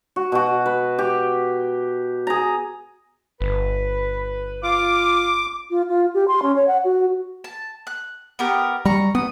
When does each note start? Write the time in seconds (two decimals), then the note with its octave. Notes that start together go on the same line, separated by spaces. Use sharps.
0.16 F#4
0.32 B2 F#4
0.66 B4
0.99 G4
2.27 G#4 A#5
3.41 G1 B4
4.63 F4 D6
5.70 F4
5.88 F4
6.14 G4
6.28 C6
6.42 C#4
6.56 C#5
6.68 F#5
6.84 F#4
7.44 A5
7.87 F#6
8.39 B3 G4 A#4
8.85 G3 A#5 C#6
9.15 B3 D#6